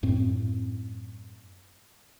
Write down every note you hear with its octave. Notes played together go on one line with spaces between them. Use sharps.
F#2 A2 C4